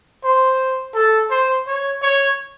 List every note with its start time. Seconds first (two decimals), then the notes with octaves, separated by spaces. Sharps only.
0.24 C5
0.95 A4
1.30 C5
1.67 C#5
2.02 C#5